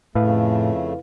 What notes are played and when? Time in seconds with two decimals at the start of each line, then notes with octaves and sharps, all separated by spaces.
0.15 F2 A2 C#3 A3 E4 B4 F5